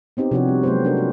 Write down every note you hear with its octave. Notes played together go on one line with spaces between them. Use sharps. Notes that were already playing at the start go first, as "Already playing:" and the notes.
B3 C4 D#4 G4
C3 F3 D4 D#4 F#4 C#5
G3
F#3 G#3 A3 B3 C5
C#4 D4 F#4 A#4
F4 G4